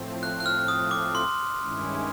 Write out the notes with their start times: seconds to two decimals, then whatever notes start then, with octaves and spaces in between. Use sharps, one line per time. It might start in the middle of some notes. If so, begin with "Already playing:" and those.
Already playing: A2 F3 A3 C4
0.23 F#6
0.40 F#6
0.46 F6
0.68 D#6
0.91 D6
1.15 C6
1.59 G2 D#3 G#3 C#4 E4